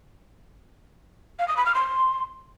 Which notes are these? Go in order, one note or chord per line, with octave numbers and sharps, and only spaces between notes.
F5
D#6
B5
F6
C6